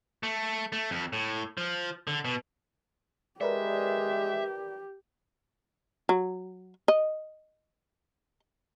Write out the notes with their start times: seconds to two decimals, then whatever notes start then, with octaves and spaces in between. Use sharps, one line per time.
0.23 A3
0.72 A3
0.91 F2
1.13 A2
1.58 F3
2.07 D3
2.25 B2
3.41 G#3 G4 A#4 B4 D5 E5
6.09 F#3
6.88 D#5